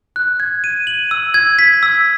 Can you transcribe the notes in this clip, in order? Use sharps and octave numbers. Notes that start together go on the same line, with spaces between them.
F#6
G#6
D#7
F#7
E6
G#6
B6
E6